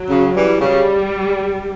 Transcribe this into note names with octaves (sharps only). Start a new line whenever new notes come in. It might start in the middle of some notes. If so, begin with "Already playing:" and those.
Already playing: F#3
C#3
E3 G3
C#3 G3